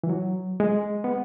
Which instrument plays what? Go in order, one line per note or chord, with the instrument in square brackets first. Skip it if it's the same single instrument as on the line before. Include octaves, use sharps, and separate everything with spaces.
[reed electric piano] E3
F#3
G#3
B3